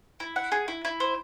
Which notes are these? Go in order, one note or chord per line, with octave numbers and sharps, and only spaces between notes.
E4
F#5
G#4
E4
E4
C5